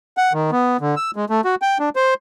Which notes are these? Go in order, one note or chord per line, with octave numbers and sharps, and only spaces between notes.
F#5
D#3
B3
D3
E6
G#3
A3
F#4
G5
D4
C5